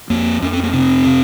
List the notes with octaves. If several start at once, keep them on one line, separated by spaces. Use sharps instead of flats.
F2 A#3
F2 C#4
C4
A#3
C3 C4
C3